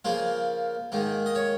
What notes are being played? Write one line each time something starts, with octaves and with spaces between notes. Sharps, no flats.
C#3 F3 A#3 F4
G#2 D#3 A#3
D#5
C#5